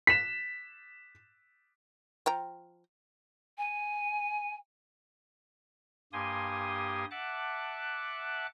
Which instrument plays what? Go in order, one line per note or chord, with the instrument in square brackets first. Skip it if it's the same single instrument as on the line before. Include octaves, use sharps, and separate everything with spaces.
[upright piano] B6 E7
[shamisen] F3 G5 A#5
[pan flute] G#5
[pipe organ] G2 A#3 G4 G#5 C6 D#6
E5 F#5 A5 D6 F#6